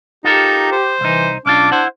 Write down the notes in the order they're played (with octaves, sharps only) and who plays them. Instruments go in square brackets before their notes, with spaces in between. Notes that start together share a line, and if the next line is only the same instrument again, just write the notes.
[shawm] D#4 [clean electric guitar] F4 A4 A#4 [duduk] G4
[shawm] C5
[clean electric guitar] C2 D#4 [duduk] E3
[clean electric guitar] B1 C#4 F4 [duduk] D4 [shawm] D6
[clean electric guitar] E4 F#5 [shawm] C5